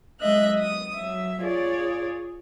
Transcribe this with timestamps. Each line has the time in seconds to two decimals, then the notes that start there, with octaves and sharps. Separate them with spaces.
0.21 F#3 G#3 D#5 E5 F#6
0.59 D#6
0.95 F#3 E5
1.41 F4 G#4 C#5 D5